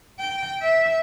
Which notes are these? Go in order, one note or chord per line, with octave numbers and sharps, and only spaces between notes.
G5
E5